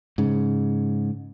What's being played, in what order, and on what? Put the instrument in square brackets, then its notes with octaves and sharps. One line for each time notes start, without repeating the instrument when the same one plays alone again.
[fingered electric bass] G#2 C#3